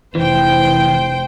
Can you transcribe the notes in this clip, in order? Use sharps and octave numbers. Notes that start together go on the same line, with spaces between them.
F1 E3 C5 G5